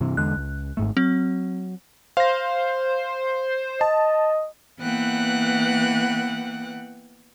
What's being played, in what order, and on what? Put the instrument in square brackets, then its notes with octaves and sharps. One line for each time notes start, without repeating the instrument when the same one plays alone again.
[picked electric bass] G2 C3 E3
[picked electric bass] E2 D3 G#3 [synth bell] F#6
[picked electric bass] C#2
G#1 G#2 A3
[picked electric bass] F#3 [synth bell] C4
[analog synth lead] C5 [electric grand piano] F5 A#6
[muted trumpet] D#5 [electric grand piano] A5
[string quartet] E3 A#3 B3 F#5 G5 F#6